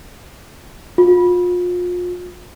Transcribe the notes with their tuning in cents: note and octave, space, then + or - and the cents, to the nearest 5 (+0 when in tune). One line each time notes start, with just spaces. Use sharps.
F4 +35